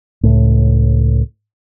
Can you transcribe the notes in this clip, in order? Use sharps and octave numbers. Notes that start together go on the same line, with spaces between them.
C#2 A2